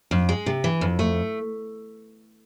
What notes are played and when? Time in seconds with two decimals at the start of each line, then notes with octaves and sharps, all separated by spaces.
0.11 F2
0.29 G#3
0.46 C3
0.64 E3
0.81 F2
0.99 A3